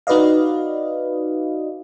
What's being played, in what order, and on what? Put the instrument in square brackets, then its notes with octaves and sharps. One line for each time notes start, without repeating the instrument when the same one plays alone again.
[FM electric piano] D#4 F#4 B4 D5 D#5 F5